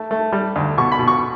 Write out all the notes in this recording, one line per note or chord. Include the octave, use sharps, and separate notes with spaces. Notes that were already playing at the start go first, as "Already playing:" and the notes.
Already playing: A3
A3
G3
D2
B2 C#6
B5
B2
C#6